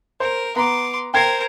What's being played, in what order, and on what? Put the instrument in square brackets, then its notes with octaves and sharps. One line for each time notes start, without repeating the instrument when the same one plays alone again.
[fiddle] A#4 [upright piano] C5
[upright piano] B3 A#5 [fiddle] C6 D6
[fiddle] A#4 C5 [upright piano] G5 G#6 C7